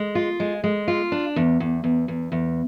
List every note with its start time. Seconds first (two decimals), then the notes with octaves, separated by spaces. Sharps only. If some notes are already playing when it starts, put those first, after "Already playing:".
Already playing: G#3
0.15 F4
0.40 G#3
0.64 G#3
0.88 F4
1.12 D4
1.36 E2
1.60 E2
1.84 E2
2.08 E2
2.32 E2